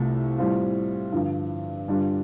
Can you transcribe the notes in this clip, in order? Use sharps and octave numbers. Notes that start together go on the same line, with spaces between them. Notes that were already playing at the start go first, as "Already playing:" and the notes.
Already playing: C2 C3 A3 F4
A2 G3 C4 F4
G2 D3 F3
G2 D3 G3 D4 F4